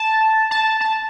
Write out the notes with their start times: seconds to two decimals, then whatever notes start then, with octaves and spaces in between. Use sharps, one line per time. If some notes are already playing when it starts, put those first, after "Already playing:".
Already playing: A5
0.51 A5
0.80 A5